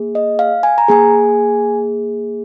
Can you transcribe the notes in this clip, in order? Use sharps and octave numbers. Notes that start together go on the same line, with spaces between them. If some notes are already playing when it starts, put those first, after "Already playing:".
Already playing: A#3 G#4
D#5
F5
G#5
A#5
A#3 G#4 G#5